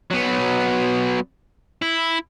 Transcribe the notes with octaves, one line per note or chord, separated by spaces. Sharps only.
F#3 B3
E4